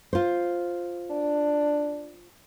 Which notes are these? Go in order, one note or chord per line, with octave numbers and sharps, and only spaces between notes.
F4 C5
D4